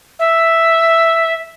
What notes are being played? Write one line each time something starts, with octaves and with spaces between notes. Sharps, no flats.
E5